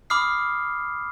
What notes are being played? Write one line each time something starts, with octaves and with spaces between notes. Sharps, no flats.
B5 D6 D#6 F6 C7